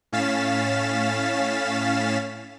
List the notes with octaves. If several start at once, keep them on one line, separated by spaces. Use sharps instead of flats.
A2 C#4 F5 A6 B6 E7